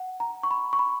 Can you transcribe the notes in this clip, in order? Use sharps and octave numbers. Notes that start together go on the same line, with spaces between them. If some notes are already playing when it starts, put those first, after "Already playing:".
Already playing: F#5
A#5
C#6
B5
C#6
B5